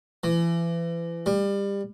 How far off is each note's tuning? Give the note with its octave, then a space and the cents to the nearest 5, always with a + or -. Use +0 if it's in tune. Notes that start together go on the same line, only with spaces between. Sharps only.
E3 +35
G3 +25